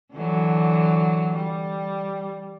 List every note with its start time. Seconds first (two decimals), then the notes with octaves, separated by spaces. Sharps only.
0.14 D3 E3 F#3
1.35 G3